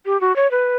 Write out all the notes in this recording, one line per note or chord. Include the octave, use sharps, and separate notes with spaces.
G4
F#4
C#5
B4